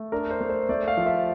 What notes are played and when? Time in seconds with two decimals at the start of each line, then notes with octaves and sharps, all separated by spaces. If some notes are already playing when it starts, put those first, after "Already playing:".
Already playing: A3
0.12 D4 A#4
0.30 C5
0.41 A3
0.50 C5
0.69 A3 D5
0.88 F5
0.97 F3
1.06 E5